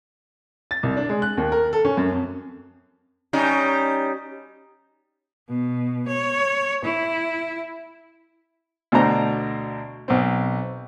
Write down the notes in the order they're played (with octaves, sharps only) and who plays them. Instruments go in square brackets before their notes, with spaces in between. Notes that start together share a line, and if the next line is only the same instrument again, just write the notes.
[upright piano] A6
C2
D4
G#3
F#6
D#2
A#4
A4
C#4
F#2
F2
[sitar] G3 C#4 D#4
[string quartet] B2
C#5
E4
[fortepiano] D2 B2 D4 C5 A#5
B1 C4